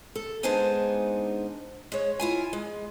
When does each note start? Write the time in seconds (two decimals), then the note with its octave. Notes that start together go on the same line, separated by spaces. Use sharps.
0.16 A4
0.43 G#3 B3 D4 D#4 C5 G#5
1.92 G#3 C#5
2.20 E4 F4 G#5
2.53 G#3